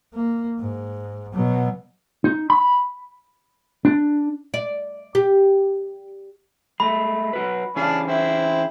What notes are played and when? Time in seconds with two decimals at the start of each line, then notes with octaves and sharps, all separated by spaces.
0.14 A#3
0.59 G#2
1.33 B2 F#3
2.24 D#4
2.50 B5
3.85 D4
4.54 D5
5.15 G4
6.80 G#3 A3 B5
7.33 F#3 F#4 B4
7.76 E3 C#4 D4 G#4 F5 A5
8.08 C4 E4